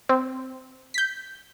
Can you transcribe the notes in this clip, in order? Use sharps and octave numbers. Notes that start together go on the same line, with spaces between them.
C4
G6 B6